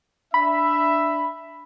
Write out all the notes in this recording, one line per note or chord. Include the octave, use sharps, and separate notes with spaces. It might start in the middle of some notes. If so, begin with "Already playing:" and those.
D4 E5 B5